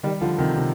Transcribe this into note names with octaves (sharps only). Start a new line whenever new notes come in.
D#3 G3
D3 F3
C3 D#3
C3